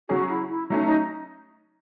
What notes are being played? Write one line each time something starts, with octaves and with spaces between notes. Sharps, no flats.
C#3 F#3 C#4 F#4 G#4
E4
E4
F#3 A3 C#4 D#4
D#4